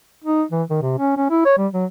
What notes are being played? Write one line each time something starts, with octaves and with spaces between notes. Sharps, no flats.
D#4
E3
D#3
C3
C#4
C#4
E4
C#5
G3
F#3